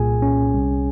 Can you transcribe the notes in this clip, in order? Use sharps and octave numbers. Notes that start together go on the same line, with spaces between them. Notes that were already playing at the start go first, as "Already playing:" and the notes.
Already playing: C2 A#2 G#4 G#5
C#4
C2